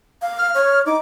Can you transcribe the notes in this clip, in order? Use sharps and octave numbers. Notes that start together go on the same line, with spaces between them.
F5
F6
C#5
D#4 D6